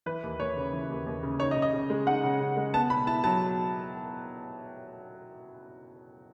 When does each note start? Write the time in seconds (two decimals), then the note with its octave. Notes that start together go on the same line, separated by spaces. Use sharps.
0.06 E3 B4
0.23 D#2
0.40 D#2 C#5
0.57 C#3
0.73 E3
0.90 D#2
1.06 D#2
1.23 C#3
1.40 D#4 C#5
1.51 D#5
1.56 C#3
1.62 D#5
1.73 C#3
1.90 G#3
2.07 D#4 F#5
2.23 C#3
2.40 C#3
2.57 G#3
2.74 B3 A5
2.90 B2 B5
3.07 E4 A5
3.24 F#3 A5